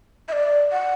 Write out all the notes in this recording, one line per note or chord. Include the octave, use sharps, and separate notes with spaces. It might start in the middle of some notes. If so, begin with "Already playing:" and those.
E5
D5
F#5